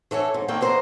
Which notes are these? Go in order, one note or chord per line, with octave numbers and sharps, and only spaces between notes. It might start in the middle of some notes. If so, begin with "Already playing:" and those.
E3 A4 C#5 G#5
G#2
D#3 A#3 C4 A4 D5 G5
D3 E3 C5 D5 D#5 A#5